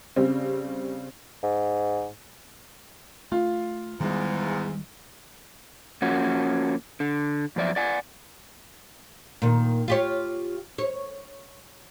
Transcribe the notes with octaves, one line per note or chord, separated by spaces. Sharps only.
C#3 G3 C4
G#2
A3 F4
E2 G#2 D#3 G3 G#3
F3 A#3 C#4 F#4
D3
F#2 F3 D5 E5
D5 F#5 G#5
A#2 D#3
F4 G4 C#5
C#5